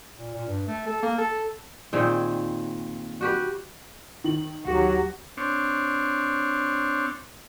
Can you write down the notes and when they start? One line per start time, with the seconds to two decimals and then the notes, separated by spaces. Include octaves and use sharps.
0.18 A#2
0.35 A#2
0.47 G2
0.67 A3
0.86 A4
1.03 A#3
1.18 A4
1.93 A#2 D#3 C4 G#4
3.21 F#4 G4 B4
4.24 D#3 F#7
4.66 D2 F#3 F#4 G4
5.37 C4 D4 C#5